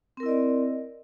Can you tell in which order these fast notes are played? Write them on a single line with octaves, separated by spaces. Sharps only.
C4 A#4 E4 D#5 D5